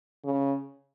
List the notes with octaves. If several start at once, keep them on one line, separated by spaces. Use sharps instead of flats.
C#3